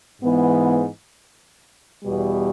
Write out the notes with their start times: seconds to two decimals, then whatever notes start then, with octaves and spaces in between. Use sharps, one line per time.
0.21 G#2 E3 G#3 B3
2.04 E2 B2 G3